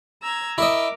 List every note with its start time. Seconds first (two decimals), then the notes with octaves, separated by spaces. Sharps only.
0.21 A#5 E6 G#6
0.58 E4 A#4 D#5 D6 E6